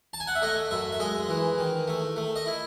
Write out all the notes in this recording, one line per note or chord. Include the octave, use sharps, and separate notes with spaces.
A5
G#5
F#5
E5
A3 D#5
F#2 E5
E5
G#3 D#5
E3
D#3
A3
A3
D#5
E4